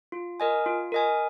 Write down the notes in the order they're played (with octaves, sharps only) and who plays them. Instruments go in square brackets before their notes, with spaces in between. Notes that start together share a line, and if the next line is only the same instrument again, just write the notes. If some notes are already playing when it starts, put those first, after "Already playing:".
[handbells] F4
A#4 D#5 G#5
F4
A#4 D#5 G#5